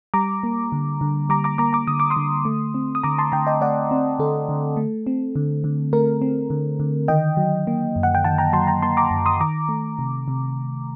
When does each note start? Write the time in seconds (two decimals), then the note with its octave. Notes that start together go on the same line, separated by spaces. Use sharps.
0.14 G3 A#5 D6
0.43 A#3
0.72 D3
1.01 D3
1.29 G3 A#5 D6
1.44 A#5 D6
1.58 A#3 A#5 D6
1.73 A#5 D6
1.87 D3 D#6
2.00 D6
2.10 C6 D#6
2.17 D3
2.45 A3
2.74 C4
2.95 D#6
3.03 D3 A#5 D6
3.18 A5 C6
3.32 D3 G5 A#5
3.47 D#5 G5
3.61 A3 D5 F#5
3.91 C4
4.19 D3 A4
4.49 D3
4.77 A3
5.07 C4
5.36 D3
5.64 D3
5.93 A3 A#4
6.22 C4
6.50 D3
6.80 D3
7.08 D#3 D#5 G5
7.37 F#3
7.67 A#3
7.96 F#2
8.03 F#5
8.15 G5
8.24 D#3 F#5 A5
8.38 G5 A#5
8.53 F#3 A5 C6
8.67 G5 A#5
8.82 A#3 A5 C6
8.97 A#5 D6
9.11 F#2
9.26 C6 D#6
9.40 D#3 A#5 D6
9.69 A3
9.99 C3
10.28 C3